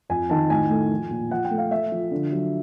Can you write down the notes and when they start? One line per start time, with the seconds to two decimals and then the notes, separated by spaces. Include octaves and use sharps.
0.09 F2 G#5
0.30 D#3 A5
0.50 A2 G#5
0.70 A3
0.91 F3
1.11 A#2
1.31 F3 F#5
1.45 G5
1.51 A3
1.58 F5
1.71 A3 E5
1.92 F3
2.11 D3
2.32 F#3